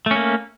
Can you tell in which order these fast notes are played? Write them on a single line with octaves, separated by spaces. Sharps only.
A3 C#4 A#3